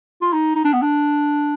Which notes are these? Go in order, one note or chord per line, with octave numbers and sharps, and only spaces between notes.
F4
D#4
D#4
D4
B3
D4